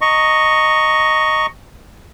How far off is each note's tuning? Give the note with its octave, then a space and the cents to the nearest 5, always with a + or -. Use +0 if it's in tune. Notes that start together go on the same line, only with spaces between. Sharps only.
D#5 +0 A#5 -15 C#6 +5